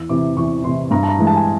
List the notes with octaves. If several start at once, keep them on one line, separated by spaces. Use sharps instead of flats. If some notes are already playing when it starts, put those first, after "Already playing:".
Already playing: E2 E6
C3 E3 D6
E2 C#6
C3 E3 C6
G2 A#5
A5
A#5
E3 G#3
A5
G#5